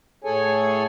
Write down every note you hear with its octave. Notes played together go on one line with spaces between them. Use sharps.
A2 G#4 A4 C#5 G#5